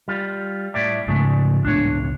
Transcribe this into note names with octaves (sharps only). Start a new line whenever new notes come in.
G3 F4
A2 D5 E5
G#2 C#3 G#3 A3
C#2 A2 D4 C#5